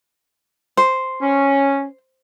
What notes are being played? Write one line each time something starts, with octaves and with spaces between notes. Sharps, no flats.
C5
C#4